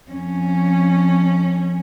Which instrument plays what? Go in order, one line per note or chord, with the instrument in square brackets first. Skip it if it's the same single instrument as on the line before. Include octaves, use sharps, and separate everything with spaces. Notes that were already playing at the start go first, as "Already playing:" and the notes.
[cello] F2 C#4